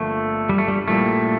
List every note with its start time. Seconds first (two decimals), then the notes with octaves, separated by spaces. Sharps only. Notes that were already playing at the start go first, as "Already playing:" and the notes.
Already playing: G1 G2 D3 F3 A3 A#3
0.49 G3
0.58 A3
0.68 G3
0.88 A#1 A#2 G3 A3 A#3 E4